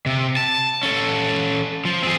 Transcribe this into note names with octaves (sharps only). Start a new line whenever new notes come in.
C3
A5
C#4 A4
F3
C4 G#4